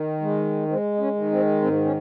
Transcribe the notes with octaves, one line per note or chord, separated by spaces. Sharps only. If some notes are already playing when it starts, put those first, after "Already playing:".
Already playing: D#3
G#3
G#3 C4
D#4
C#4
D#3
C4
G#2 C4
C#4